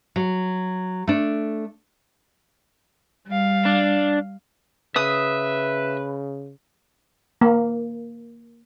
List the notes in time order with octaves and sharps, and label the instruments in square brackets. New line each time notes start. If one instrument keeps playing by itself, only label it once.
[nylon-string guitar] F#3
A3 D4
[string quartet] G3 F5
[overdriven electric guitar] D4
[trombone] C#3 [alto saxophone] B4 [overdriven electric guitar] E5 [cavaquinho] D#6
[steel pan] A#3